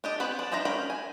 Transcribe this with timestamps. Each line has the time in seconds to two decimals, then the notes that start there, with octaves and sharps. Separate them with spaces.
0.04 D4 G4 D#5
0.20 B3 C4 B4 B5
0.39 D4
0.52 D4 D#4 C5 E5 A#5
0.65 C#4 A#4 G5 B5
0.90 G#5